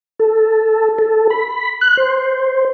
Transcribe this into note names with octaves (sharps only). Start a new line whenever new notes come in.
A4
A4
B5
F#6
C5